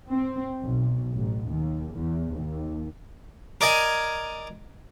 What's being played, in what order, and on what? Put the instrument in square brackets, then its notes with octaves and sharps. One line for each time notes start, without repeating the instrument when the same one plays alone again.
[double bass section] C4
B1
A1
D#2
E2
D#2
[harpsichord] A#4 D5 D#5 G#5